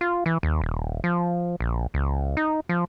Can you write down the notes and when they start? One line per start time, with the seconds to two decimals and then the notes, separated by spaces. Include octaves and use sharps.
0.01 F4
0.26 E3
0.43 D#2
0.62 D#1
1.04 F3
1.60 A#1
1.94 C#2
2.37 D#4
2.69 F3